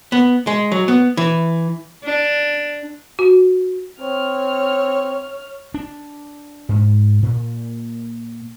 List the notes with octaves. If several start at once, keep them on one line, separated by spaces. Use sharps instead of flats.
B3
G#3
F#3
B3
E3
D4
F#4
C4 C#5 F6
D4
G#2
A#2